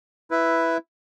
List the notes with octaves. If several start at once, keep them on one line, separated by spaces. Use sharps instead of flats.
E4 B4 E5